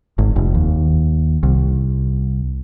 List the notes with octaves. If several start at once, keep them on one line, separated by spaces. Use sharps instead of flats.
G#1
F1
D#2
C2